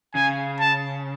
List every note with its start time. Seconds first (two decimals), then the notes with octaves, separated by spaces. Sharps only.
0.15 C#3 G#5
0.60 A5